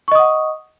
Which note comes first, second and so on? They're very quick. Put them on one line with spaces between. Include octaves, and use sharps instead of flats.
C#6 D#5 D#6 F#5